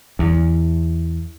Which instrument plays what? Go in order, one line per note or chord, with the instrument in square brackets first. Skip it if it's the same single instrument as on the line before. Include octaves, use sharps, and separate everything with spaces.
[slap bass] E2